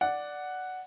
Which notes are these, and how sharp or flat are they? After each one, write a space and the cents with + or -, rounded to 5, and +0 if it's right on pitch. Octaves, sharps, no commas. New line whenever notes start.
D5 +0 F#5 +0